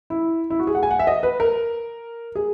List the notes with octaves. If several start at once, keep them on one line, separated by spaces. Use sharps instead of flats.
E4
E4
F#4
G#4
F#5
G#5
F#5
E5
D#5
B4
A#4
G#4